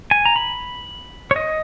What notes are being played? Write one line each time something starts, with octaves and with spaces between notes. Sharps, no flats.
G#5
A#5
B5
C#5
D#5